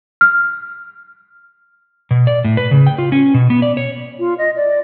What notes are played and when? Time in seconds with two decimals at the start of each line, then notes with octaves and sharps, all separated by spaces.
0.21 F6
2.11 B2
2.27 D5
2.44 A2
2.57 B4
2.71 C#3
2.87 G5
2.98 F4
3.12 C#4
3.34 B2
3.50 B3
3.62 D5
3.77 C#5
4.19 F4
4.38 D#5
4.56 D5